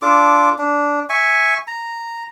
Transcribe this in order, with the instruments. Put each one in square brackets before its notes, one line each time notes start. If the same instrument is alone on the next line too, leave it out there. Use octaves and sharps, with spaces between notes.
[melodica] D4 F4 A4 D6
D4
E5 G#5 C#6
A#5